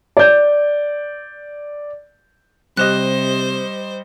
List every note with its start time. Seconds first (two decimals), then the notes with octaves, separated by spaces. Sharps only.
0.17 D5 G6
2.77 C3 G3 G4 C5 D#5 F#6